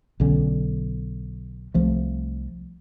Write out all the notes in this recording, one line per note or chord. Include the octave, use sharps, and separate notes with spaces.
B1 D3 C#4
C2 F3 A3